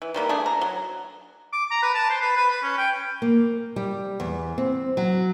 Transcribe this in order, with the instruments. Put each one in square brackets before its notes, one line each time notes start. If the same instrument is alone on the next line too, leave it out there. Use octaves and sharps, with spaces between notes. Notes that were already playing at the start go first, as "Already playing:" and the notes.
[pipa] E3
D#3 G3 A#3 B3
A3 D4 G#4
A#5
F#3
[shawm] D6
A#5
B4
A5
C5
B4
B4
B4
C#4
G5
[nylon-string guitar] A#3
G3
E2
C4
F#3